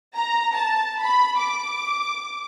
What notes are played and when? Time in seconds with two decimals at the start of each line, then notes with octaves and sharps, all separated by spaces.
0.16 A#5
0.54 A5
1.01 B5
1.38 D6